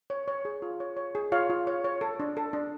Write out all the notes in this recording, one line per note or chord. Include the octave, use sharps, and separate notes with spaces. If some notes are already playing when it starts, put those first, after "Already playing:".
C#5
C#5
G#4
F4
C#5
C#5
G#4
F4 C#5 F5
F4
C#5
C#5
A4
D4
A4
D4